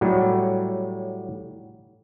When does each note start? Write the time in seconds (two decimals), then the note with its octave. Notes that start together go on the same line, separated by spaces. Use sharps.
0.01 A2 F#3 G3